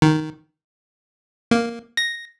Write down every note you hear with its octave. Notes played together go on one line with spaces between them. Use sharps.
D#3
A#3
A#6